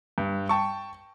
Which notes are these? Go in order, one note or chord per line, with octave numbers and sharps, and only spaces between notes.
G2
G5 A5 C#6